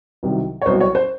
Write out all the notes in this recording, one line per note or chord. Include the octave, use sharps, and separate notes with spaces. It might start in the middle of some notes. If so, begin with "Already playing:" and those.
C2 C3 D#3 F#3
C#5
C2 B2 F#3 C5
C#5
C5